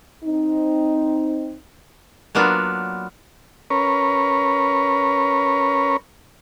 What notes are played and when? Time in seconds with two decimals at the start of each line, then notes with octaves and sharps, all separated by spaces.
0.24 C4 D#4
2.35 F#3 A#3 B3 D4 F4
3.70 C#4 A#4 B4 C#5